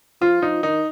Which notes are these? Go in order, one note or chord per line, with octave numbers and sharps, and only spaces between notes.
F3 F4
F3 D#4
D#3 D#4